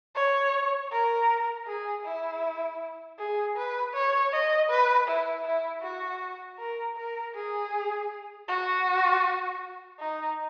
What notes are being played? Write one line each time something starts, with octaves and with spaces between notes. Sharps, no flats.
C#5
A#4
G#4
E4
G#4
B4
C#5
D#5
B4
E4
E4
F#4
A#4
A#4
G#4
F#4
D#4